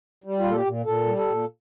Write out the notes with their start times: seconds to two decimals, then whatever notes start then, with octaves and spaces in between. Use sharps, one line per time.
0.24 G3
0.39 F4
0.44 A#2
0.51 A4
0.54 G4
0.65 A#2
0.86 A#2 A4
1.06 G3
1.17 A4
1.27 A#2